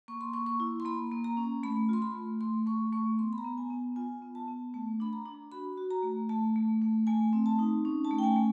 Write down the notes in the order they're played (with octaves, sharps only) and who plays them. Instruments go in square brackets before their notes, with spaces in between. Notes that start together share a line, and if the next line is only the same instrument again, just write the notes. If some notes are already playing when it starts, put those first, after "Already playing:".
[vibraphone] A#3 C#6
C6
A#3 C#6
C#6
E4
C6
A#3 B5
A#3
A#5
C#4
A3 B5
F4 C6
B5
A3
A3 C6
A3 C#6
A3 C#6
B3 C6
B5
A#5
B3
G#5
B3
F4 G#5
B3
A5
B3
A3 A5
D4 B5
A#5
D4
F#4 B5
F#4
A#5
A3
A3 A5
A3
A3
A3 G#5
C4
A5
D#4
C#4
A5
A3
G5
G#5
A3